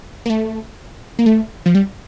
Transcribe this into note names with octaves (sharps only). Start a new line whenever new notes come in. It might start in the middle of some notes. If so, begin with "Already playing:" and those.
A#3
A3
A#3
A3
F3
G3